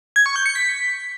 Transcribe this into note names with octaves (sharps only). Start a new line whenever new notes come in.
G#6
C#6
G6
C#7
B6